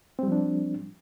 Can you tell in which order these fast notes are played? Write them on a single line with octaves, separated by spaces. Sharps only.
C4 G3 F3 D4